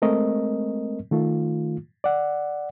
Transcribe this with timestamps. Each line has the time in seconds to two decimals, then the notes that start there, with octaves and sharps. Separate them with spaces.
0.02 G#3 A3 C4 A#4 D#5
1.11 D#3 A3 F4
2.04 D5 F#5